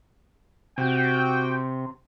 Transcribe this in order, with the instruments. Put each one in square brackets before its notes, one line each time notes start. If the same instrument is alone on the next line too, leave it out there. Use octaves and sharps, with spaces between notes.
[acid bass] C3 [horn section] F#4 G5